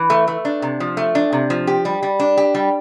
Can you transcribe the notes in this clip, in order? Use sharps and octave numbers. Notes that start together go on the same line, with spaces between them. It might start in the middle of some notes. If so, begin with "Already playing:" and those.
Already playing: E3
A3
A3
D4
C3
F3
A3
D4
C3
F3
G4
G3
G3
D4
G4
G3